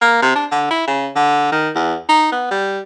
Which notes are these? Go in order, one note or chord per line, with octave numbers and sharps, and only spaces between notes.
A#3
C3
D4
D3
E4
C#3
D3
D#3
E2
D#4
B3
G3